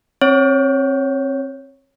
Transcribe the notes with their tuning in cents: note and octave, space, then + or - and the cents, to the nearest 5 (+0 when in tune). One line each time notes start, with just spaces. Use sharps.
C4 +30 C#5 +0